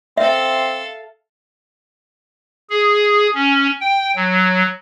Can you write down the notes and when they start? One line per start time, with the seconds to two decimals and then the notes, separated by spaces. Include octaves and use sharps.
0.18 C4 A4 E5 F5
2.69 G#4
3.34 C#4
3.80 G5
4.16 F#3